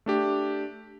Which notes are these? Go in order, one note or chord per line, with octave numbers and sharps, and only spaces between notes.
A3 D4 G4